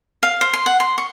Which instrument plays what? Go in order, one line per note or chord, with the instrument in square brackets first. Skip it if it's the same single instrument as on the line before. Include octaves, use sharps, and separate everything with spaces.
[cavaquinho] F5
C5
C6
F#5
C6
C#6